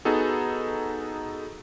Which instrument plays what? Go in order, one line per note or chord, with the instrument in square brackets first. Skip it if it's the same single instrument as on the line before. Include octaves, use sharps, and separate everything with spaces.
[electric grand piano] B3 D#4 F#4 G#4 A4